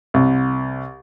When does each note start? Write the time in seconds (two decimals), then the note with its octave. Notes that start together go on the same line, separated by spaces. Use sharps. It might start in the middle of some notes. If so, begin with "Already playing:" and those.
0.14 C2